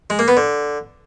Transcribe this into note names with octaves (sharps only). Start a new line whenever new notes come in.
G#3
A#3
B3
D3